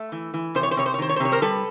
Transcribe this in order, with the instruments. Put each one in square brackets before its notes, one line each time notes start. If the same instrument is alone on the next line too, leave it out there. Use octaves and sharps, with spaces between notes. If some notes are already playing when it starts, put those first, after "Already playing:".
Already playing: [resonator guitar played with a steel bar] A3
E3
E3
C3 C5
C#5
C5
C3 C#5
C5
C#5
D#3 C5
C#5
C5
C3
C#5
A#4 C5
G3 A4 B4